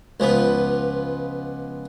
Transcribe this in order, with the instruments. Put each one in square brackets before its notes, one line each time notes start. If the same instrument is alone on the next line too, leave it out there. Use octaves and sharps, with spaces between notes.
[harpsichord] C#2 F3 B3